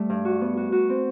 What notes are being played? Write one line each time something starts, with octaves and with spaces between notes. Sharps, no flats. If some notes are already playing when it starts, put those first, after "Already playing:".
Already playing: G3 A3
G2
F#4
B3
F#4
F#4
C4